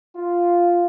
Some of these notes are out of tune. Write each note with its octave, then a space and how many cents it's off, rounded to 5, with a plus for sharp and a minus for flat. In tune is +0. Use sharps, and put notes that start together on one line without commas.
F4 +0